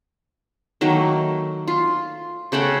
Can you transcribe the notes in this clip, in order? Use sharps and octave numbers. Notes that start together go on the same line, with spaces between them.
D#3 F#3 A3 A#3
F4
C#3 A3 F#5 G5